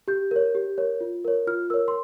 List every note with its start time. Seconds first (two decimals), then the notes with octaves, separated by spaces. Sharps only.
0.08 G4 G6
0.31 A#4 C#5
0.55 G4
0.78 A#4 C#5
1.01 F4
1.25 A#4 C#5
1.47 F4 F6
1.70 A#4 C#5 E6
1.88 C6